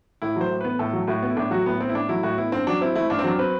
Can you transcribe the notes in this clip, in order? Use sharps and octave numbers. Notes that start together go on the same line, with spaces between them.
A2 E4
F#3 C5
A2
B3 B4
A2 A4
F#3
A2 F#4
B3
E4
A2 D4
F#3 F#4
A2 B3
B3 C4
E4
A2 D4
F#3 E4
A2 F#4
B3 E4
G2 C4
F#3 D4
C4 E4
A3 E4
G2 D4
C4
F#3 D4
C4 B4